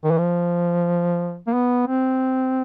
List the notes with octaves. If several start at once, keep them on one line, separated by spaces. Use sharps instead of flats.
D#3
E3
F3
A#3
B3
C4